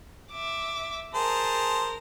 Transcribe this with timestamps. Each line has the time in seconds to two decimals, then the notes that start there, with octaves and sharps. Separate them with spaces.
0.32 E5 D6
1.14 G#4 A#4 C5 A5